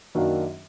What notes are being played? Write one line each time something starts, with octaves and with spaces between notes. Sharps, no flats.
F#2 D#3 F#3 A#3 D4